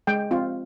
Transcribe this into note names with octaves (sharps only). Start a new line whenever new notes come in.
G#3 G5
C4 F4